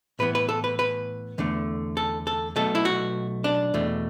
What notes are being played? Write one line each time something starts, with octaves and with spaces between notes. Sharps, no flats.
A2 E3 B3 B4
B4
A4
B4
B4
E2 D3 A3
A4
A4
B1 B2 A3 A4
E4
F#4
D4
E2 B2 A3